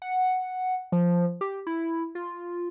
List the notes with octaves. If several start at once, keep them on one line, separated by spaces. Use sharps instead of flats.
F#5
F3
G4
E4
F4